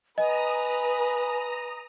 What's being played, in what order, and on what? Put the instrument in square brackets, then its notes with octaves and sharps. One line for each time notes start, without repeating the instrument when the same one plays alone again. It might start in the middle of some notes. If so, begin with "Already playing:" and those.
[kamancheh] B4 [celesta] D#5 [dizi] G#5 [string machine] A#5 D#6